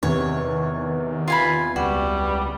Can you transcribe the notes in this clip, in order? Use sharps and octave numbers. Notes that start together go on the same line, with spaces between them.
E2 C3 D#3 C#5
F4 G#5 B5
C#2 G3 F#4